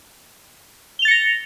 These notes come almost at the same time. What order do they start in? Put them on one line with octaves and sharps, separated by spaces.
G7 F7 A6 C#7 A#6